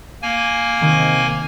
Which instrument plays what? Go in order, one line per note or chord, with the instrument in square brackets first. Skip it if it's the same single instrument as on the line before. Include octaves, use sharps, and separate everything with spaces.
[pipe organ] A#3 G#5
[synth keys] C3 D#3